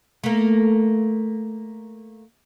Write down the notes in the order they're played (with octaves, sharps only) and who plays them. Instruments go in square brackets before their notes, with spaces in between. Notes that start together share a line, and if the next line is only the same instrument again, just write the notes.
[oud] A3 A#3